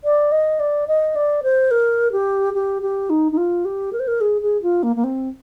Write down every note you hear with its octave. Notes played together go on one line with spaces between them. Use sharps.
D5
D#5
D5
D#5
D5
C5
A#4
G4
G4
G4
D#4
D#4
F4
G4
A#4
C5
A#4
G#4
G#4
F4
A#3
A#3
C4